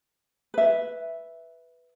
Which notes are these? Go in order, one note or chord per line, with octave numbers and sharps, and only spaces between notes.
B4 E5